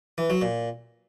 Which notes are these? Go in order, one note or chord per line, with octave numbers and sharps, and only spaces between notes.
E3
F#3
A#2